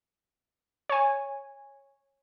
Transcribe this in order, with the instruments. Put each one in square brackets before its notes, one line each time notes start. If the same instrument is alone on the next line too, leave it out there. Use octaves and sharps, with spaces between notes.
[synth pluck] C#5 G#5